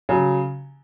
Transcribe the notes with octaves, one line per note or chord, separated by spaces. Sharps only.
C#3 F#3